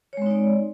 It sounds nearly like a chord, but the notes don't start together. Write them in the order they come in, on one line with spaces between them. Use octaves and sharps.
C#5 G#3 C4 D#4 D5